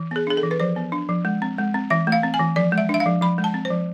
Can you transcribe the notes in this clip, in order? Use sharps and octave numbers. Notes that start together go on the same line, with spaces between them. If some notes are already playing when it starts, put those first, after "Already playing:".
Already playing: E3
B3 G#4
D4 G#4
A4
E3
B4
F3 C5
B3
D4
F3
G#3
C4
G#3
C4
E3 E5
A3
F5
C4
G#5
E3
F3 D5
G#3
E5
D4 E5
F5
F3
F3 B5
G#3
A5
C4
C5
F3